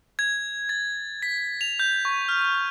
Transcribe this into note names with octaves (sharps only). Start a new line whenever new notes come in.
G#6
A6
B6
F7
G6
C#6
F6